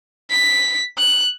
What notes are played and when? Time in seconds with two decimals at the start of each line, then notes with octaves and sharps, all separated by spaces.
0.31 B6
0.98 F#6